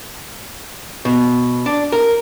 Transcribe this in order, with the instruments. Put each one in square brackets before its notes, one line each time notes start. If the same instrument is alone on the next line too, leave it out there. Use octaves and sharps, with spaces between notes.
[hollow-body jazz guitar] B2
D4
A#4